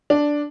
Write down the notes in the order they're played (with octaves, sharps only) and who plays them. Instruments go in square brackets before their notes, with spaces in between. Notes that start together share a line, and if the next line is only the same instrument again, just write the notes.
[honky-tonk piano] D4